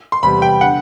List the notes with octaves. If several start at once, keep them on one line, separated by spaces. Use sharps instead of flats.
C6
E2 C3 G3 B3 B5
G5
D3 F#5